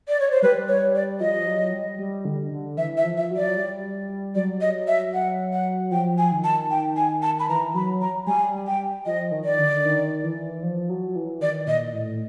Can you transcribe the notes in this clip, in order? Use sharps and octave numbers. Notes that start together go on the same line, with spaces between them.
D5
C#5
C5
G3 B4
C#5
D5
F3 D#5
F#3
G3
G3
D3
D3
E3 E5
E5
F3
E5
F#3
D5
G3
F#3 D5
D#5
E5
F#5
F#5
F3 G5
G#5
D#3
A5
G5
G#5
A5
B5
E3 A#5
F#3 B5
A#5
G3 G#5
G5
F3 D#5
D#3
D5
D3
D#3
E3
F3
F#3
E3
D#3 D5
A#2 D#5
A2